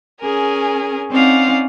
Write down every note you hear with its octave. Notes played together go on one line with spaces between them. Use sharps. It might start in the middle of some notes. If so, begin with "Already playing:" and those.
C#4 G#4 A#4 G#5
C4 C#4 D#4 D5 F5 F#5